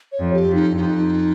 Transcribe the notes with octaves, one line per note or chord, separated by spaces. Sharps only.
C#5
F2
G4
F2
D#4
F2 D#4